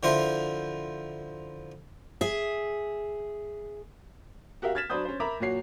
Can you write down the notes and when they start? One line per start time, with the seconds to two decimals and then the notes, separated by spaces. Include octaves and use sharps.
0.03 D3 F3 E4 A#4 C5
2.21 G#4 E5
4.62 F#4 G4 A#4 E5 F5
4.75 F6 G#6 A6 B6 E7
4.90 F#3 D4 C5 B5 D#6 G6
5.05 C#4 C5
5.20 A#4 E5 A#5 B5 D6
5.40 A#2 F#3 F#4 C#5 C7